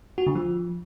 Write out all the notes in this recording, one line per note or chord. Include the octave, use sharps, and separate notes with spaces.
F#4
D3
F3